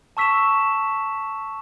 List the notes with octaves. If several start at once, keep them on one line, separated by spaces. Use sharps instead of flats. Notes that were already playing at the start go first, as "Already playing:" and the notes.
A5 C#6 E6 B6 E7